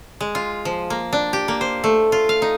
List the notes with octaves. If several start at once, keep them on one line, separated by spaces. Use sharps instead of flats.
G#3
F4
F3
A#3
D4
G4
A#3
C5
A3
F4
F5
D#4